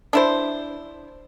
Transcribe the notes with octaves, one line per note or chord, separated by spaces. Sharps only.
D4 E4 C5